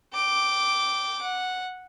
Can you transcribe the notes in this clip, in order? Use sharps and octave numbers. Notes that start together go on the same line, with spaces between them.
G5 D6
F#5